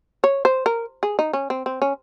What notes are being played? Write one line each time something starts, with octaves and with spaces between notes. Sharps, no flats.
C#5
C5
A#4
G#4
D#4
C#4
C4
C4
C#4